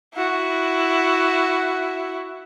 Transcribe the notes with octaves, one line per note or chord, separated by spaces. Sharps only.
E4 F#4